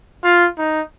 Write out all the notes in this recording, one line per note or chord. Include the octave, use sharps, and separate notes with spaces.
F4
D#4